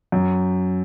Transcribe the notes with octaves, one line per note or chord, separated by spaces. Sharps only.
F#2